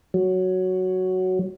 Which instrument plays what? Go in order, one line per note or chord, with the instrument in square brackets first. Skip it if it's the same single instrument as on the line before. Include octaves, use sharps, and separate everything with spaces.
[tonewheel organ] F#3